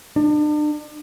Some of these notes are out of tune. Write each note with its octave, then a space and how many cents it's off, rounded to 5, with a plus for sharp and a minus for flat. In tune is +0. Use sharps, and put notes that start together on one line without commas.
D4 +35